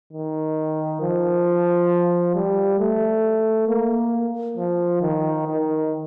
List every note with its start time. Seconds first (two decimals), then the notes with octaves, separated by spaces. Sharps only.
0.13 D#3
1.01 F3
2.35 G3
2.79 A3
3.68 A#3
4.57 F3
5.01 D#3
5.47 D#3